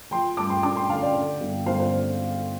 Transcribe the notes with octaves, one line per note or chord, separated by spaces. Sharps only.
F3 G5 C6
G2 A5 D6
G5 C6
D4 A5 D6
G5 C6
D3 F5 A5
D5 G5
D3
G1
G1 C5 F5
C5